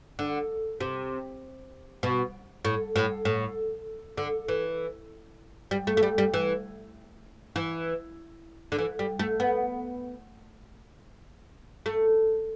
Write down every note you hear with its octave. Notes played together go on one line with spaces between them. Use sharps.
D3
C3
B2
A2
A2
A2
D3
E3
G3
A3
A3
G3
G3
E3
E3
D3
E3
G3
A3
B3
A3